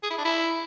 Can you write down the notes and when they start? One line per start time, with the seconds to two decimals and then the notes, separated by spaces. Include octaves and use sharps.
0.03 G#4
0.10 E4
0.18 D4
0.25 E4